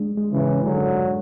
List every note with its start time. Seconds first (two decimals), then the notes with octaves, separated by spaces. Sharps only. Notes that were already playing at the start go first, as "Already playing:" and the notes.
Already playing: G#3 D4
0.17 G#3
0.32 C#3 E3
0.40 G#2
0.64 D3 F#3 G#3
0.88 G#2